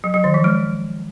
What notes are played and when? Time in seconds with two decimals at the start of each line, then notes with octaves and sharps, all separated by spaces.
0.04 F#3
0.14 F#3
0.24 D#3
0.34 F3
0.44 G#3